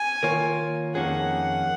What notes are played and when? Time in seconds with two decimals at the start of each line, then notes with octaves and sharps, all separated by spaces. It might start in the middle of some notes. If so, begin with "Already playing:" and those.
Already playing: G#5
0.23 D#3 A#3 F4 A#4 C#5
0.95 F2 D#3 A#3 C#4 G#4 F#5